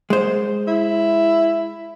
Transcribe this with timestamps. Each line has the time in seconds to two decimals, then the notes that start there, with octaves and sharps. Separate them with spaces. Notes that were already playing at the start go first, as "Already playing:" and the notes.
0.10 G#3 C5
0.67 E4